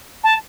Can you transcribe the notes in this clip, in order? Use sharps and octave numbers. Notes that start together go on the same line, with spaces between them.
A5